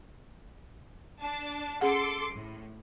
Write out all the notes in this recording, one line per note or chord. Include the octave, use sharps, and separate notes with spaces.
D4 A5
C#4 G#4 A4 F#5 C6 D6
A2